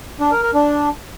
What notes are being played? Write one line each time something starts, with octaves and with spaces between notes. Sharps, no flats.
D4
A#4
A#4
D4